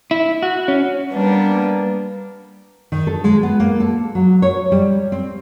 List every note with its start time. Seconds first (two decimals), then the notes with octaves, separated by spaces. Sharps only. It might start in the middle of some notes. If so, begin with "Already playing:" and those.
0.11 E4
0.43 F#4
0.68 C#4
1.12 G3 A#3 B3 D4
2.92 D#3
3.07 A4
3.24 G#3
3.43 B3
3.60 A#3
3.80 A4
4.15 F#3
4.42 C#5
4.72 G3
5.12 C4